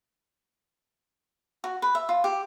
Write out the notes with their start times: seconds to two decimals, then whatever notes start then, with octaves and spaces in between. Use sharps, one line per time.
1.64 F#4
1.82 B4
1.95 E5
2.09 F4
2.24 G4